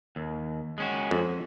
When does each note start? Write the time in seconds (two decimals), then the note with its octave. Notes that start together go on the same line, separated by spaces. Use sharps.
0.16 D#2
0.78 G#3 C#4 F#4
1.11 F2